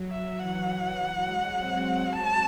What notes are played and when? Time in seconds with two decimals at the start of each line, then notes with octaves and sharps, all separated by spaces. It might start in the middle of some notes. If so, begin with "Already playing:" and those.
Already playing: F#3
0.10 E5
0.40 E3 F#5
0.97 F#3
1.26 G#3
1.54 C4
2.12 F#4 A5